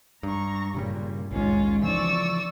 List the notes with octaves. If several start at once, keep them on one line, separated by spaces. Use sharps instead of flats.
G2 A#5 C#6
G2 A#2 C#3 G3
A#1 D#2 G#2 C#4 F4
C#3 E3 F3 D5 C#6 E6